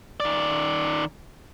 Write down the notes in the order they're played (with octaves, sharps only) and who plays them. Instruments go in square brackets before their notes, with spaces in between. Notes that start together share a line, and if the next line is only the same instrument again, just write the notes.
[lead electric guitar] D#3 D5